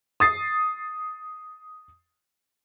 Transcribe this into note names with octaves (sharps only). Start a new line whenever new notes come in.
D#6 A6 C7